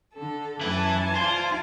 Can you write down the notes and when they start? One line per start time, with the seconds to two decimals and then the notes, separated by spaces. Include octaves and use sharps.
0.14 D3 A4
0.61 F#2 E3 E4 B4 G#5 A5
1.15 F4 C5 D5